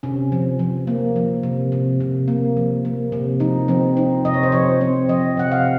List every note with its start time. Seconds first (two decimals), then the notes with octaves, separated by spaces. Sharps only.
0.03 C3 C#4
0.32 F3
0.59 F3
0.87 A#3
1.16 F3
1.43 C3
1.72 C3
2.00 C3
2.28 A#3
2.57 F3
2.85 A#3
3.12 C3
3.40 F3 D#4
3.68 F3 C4
3.97 F3 D#4
4.25 C3 D#5
4.34 C#5
4.43 C5
4.52 F3 C#5
4.81 C4
5.09 F3 D#5
5.37 C3 F#5
5.52 F5